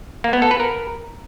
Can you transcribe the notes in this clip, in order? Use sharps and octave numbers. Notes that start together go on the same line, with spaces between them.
A#3
B3
A4
B4
A#4